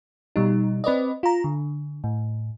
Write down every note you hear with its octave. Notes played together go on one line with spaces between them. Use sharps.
B2 G3 D#4
C4 B4 D5 D#5
F4 A#5
D3
A2